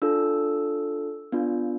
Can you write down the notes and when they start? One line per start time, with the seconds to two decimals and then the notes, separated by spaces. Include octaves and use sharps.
0.02 D4 F4 A4 E6
1.32 B3 D4 F4